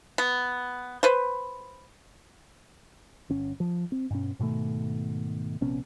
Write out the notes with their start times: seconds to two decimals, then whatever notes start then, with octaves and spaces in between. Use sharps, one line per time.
0.18 B3
1.03 B4 C5
3.30 G1 C#4
3.60 F3
3.92 C4
4.10 G2 B2 C#4
4.39 G#2 B2 D#3 A3
5.61 A#1 C3 B3 C#4